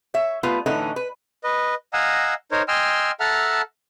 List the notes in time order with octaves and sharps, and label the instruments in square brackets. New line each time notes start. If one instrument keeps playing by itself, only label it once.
[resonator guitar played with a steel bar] C#5 E5
G3 A3 B3 F4 B4
A2 D3 E3 A3 C#4 D#4
B4
[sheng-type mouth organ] B4 D#5
D#5 F5 F#5 G#5 A#5 E6
D#4 A#4 C5 C#5
D#5 G5 G#5 C6 E6 F6
A4 E5 F#5 A5 A#5 F6